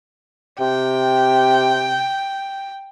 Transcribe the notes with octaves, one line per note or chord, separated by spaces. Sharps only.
C3 G5